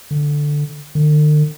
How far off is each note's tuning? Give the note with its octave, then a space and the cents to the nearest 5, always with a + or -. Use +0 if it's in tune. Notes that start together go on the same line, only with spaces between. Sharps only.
D3 +0
D3 +45